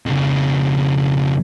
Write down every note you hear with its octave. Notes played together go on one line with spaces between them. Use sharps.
F2 C#3